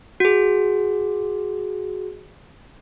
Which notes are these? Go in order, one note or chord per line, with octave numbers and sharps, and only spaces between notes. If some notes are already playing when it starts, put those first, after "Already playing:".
F#4 G#4